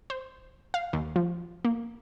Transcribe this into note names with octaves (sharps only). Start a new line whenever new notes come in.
C5
F5
D#2
F3
A#3